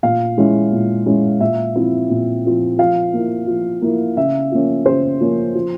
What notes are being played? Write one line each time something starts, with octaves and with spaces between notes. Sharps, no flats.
A#2 F5
G#3 C#4 E4
A#2
G#3 C#4 E4
A#2 E5
F3 C4 E4
A#2
F3 C4 E4
F3 F5
A#3 E4
F3
A#3 E4
C#3 E5
F3 A#3 C#4
C#3 C5
F3 A#3 C#4
F3